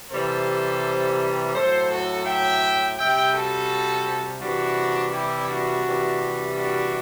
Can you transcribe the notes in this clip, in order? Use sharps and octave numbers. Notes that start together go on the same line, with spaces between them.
C3 E3 G3 A4 C5
A2 F#3 A4 C5
F#4 A4
E5 G5
C3 G3 E5 G5
F#4 A4
C3 E3 G3 D4 F#4
E4 G4
D4 F#4
C3 E3 G3
D4 F#4